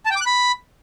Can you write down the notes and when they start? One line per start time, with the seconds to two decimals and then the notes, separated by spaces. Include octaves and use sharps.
0.06 A5
0.11 G5
0.16 D6
0.21 F#6
0.26 B5